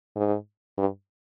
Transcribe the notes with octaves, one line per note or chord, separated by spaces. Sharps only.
G#2
G2